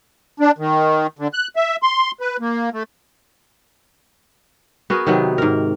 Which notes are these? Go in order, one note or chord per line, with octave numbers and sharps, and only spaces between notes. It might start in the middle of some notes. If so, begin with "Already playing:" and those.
D4
D#3
D3
F#6
E5
C6
B4
A#3
A3
B3 F#4 G#4 A#4
C3 D#3 F#3 B3
G#2 A#4